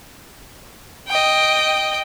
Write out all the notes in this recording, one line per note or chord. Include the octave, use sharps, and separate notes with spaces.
D#5 G5